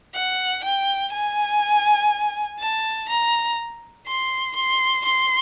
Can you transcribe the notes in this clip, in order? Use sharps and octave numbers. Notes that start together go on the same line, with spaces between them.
F#5
G5
G#5
A5
A#5
C6
C6
C6